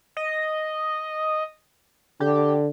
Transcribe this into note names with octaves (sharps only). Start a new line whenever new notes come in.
D#5
D3 G4